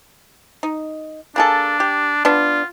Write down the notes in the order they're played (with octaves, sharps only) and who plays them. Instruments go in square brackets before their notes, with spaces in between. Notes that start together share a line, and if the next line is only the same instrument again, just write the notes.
[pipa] D#4
[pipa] A#3 G#4 A4 [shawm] D4
[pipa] G4
[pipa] B3 D4 [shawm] F4